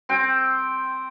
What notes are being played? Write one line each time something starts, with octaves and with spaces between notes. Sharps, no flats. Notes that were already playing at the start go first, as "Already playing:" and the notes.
C4 G5